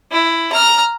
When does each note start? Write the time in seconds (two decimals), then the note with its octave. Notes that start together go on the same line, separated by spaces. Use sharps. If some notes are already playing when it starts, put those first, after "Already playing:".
0.12 E4
0.52 A#5 F6